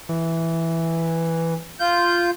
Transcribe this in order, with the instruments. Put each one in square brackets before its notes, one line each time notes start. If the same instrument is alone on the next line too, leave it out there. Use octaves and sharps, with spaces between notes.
[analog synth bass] E3
[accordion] F4 G6